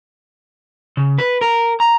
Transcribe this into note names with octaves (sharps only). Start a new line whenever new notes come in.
C#3
B4
A#4
A#5